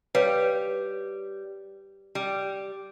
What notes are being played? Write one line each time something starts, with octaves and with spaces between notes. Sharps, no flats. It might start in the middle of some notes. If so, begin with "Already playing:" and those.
G3 B4 C#5 F5
G3